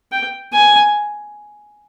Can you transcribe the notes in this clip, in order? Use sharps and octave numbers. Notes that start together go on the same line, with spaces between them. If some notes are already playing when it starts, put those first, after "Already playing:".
G5
G#5